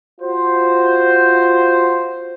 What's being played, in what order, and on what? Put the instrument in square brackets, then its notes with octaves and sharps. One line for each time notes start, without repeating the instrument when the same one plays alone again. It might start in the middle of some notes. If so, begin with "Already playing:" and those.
[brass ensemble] F4 F#4 C5